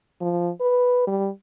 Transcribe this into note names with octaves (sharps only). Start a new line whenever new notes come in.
F3
B4
G3